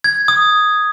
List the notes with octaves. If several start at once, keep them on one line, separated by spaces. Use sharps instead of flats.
G#6
D#6